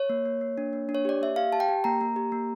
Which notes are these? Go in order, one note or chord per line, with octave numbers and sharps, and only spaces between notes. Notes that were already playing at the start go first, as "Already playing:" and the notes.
Already playing: C#5
A#3
A#3
A#3
D4
A#3
D4
C#5
G4 D5
A#3 E5
G4 F5
G4 A5
G5
G4
A#3 A#5
A#3
G4
A#3